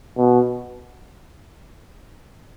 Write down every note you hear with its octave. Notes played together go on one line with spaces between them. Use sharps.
B2